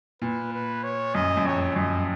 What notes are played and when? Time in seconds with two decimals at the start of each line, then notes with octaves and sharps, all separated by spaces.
0.22 A#2 B4
0.52 B4
0.83 C#5
1.14 F#2 D#5
1.37 F#2
1.45 F2 C#5
1.76 F#2 D#5